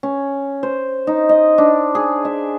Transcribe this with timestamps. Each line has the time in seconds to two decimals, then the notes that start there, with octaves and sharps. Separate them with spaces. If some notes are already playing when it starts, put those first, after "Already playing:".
0.03 C#4
0.63 C5
1.07 D#4
1.29 D#5
1.58 D4
1.95 G#4
2.25 E5